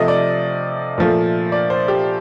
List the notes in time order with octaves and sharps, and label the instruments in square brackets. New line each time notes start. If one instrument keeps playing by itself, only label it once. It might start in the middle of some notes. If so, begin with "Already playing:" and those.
Already playing: [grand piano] C3 F3 A3 D#5
D5
A#2 F3 A3
D5
C5
G4